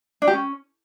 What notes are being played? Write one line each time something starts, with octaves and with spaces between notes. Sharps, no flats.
D4
G4
C#4